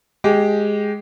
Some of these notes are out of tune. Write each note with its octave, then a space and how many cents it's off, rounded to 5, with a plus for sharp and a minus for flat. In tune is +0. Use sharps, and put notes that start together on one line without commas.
G#3 +0 G4 -10